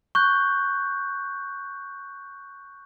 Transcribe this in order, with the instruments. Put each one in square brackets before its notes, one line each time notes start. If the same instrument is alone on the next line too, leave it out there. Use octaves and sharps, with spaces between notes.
[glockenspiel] C#6 F#6 G6